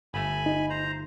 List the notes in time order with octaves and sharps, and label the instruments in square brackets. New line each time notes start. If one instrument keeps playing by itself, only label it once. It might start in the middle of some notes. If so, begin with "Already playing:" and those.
[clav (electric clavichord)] G1 A3 [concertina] G#5 B5
[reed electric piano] D#4
[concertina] C5 A#5